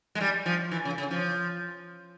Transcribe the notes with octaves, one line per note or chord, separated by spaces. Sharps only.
G#3
G3
F3
E3
C#3
C#3
F3